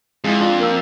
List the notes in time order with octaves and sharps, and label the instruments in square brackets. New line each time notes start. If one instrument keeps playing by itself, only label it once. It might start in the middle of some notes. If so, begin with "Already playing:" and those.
[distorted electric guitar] F2 [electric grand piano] G#3 E4
[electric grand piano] D4 F4
A#3 A#4 E6